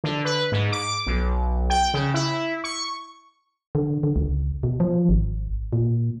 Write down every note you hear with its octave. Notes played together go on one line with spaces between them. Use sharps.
D3
B4
G#2
D6
B1
G5
C#3
E4
C#6
D3
D3
C#2
B2
F3
G#1
A#2